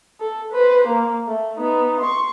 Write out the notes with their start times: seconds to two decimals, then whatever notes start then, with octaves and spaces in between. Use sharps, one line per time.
0.20 A4
0.52 B4 C5
0.87 A#3
1.27 A3
1.58 B3 D#4
2.01 C6 C#6